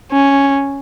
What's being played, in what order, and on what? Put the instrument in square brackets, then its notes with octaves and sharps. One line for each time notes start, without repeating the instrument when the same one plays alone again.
[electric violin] C#4